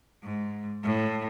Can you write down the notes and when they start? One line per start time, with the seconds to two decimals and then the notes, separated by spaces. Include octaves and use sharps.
0.24 G#2
0.83 A2